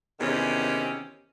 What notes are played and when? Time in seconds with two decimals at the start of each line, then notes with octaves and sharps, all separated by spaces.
0.20 E2 C3 D#3 C#4